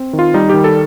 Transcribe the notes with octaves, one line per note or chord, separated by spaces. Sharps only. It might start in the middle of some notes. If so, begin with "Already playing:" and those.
Already playing: C4
D#3
F4
G3 D#4
D#3 G4
A4